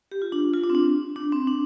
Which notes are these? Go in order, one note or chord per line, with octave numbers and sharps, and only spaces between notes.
G4
F4
D4
F4
D4
C4
D4
D4
C4
D4